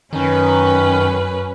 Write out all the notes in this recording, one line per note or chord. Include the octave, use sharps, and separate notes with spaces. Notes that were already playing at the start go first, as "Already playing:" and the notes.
F#2 D#3 C#4 B4